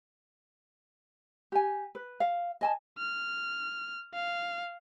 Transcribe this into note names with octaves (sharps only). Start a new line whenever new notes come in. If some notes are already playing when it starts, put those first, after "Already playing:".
G4 G#5
B4
F5
D#5 G#5 A5
F6
F5